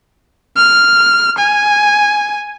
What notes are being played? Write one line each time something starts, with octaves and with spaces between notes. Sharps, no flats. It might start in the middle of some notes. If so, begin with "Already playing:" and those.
F6
G#5